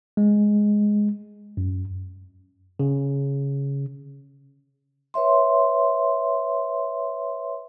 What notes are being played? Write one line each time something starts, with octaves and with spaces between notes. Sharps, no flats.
G#3
F#2
C#3
B4 C#5 E5 C6